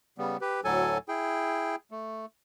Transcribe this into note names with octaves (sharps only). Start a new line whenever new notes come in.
C#3 G3 B3
G4 B4
D2 A2 F#3 A4 G#5
E4 G#4 G5
A3